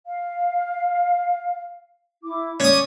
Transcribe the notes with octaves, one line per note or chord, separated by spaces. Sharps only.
F5
E4 D6
C#4 D5 D6 D#6